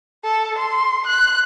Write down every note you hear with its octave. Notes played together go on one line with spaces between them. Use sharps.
A4
C6
F#6